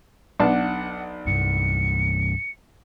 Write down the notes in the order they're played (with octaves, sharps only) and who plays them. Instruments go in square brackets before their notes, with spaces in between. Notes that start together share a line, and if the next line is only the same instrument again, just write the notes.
[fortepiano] B1 D4 A5 [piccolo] F#5
[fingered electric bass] C2 G2 [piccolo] C#7